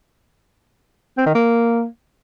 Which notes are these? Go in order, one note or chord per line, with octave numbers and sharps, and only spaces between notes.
C4
D#3
A#3